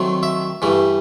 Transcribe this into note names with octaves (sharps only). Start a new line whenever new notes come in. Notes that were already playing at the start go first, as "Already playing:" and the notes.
Already playing: D#3 F#3 A3 C4
E5
G2 E3 A3